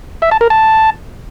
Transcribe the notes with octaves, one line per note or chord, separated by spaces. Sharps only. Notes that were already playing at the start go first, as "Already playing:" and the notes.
E5
A5
A#4
A5